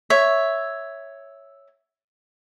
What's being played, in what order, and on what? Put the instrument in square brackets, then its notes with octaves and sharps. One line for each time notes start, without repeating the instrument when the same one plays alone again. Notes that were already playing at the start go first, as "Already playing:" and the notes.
[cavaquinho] C#5 E5